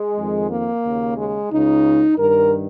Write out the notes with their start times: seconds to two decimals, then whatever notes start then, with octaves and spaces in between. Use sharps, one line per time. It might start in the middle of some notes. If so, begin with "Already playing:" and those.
Already playing: G#3
0.16 F2 D#3
0.50 A#3
0.84 D#2 C#3
1.17 G#3
1.51 C#2 C#3 D#4
2.19 G2 D#3 A#4